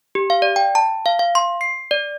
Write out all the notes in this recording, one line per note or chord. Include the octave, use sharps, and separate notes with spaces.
G4
F5
D5
G5
A5
F5
F5
C6
C7
D5